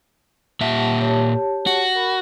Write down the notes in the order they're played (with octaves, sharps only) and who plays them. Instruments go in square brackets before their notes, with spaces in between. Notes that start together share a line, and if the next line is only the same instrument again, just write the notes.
[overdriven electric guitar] A#2 E5 [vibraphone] G4 F#5 A5
[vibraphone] G4 C#5 A5
[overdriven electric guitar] F#4
[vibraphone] A#4 B5